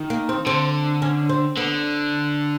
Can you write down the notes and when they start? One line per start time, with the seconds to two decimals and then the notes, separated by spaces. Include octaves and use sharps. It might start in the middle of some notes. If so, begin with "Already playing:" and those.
Already playing: D#3
0.10 A#3
0.29 C4
0.46 D3 C4
1.02 C#4
1.29 C4
1.57 D3 B3